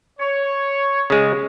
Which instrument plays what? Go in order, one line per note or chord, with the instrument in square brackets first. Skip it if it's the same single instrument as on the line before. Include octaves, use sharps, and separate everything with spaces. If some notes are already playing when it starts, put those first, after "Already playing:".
[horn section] C#5
[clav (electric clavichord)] C#3 G#3